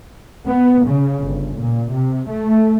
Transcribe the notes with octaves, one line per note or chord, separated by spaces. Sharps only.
B3
C#3
G1
A#2
C3
A3